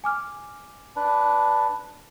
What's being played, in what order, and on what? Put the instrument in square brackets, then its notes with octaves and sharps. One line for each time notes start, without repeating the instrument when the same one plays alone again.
[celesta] G#5 D6 F6
[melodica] D4 B4